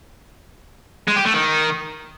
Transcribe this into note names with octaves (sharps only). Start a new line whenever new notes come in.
G#3
G4
A3
D#3